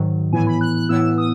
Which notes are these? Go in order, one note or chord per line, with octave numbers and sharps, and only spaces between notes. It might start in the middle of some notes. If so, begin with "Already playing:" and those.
Already playing: G#2 D#3 F#3
A2 E3 B3 E4 G#5
B5
F#6
F#6
A2 E3 B3 E4 E6
D#6